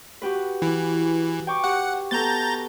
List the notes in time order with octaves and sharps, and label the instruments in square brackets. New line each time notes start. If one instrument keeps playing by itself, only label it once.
[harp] F#4 G4 B4
[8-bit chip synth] E3
[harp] G5 C#6 D6
[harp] G4 [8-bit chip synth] F#5
[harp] B3 A4 [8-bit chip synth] A#5 G6 A6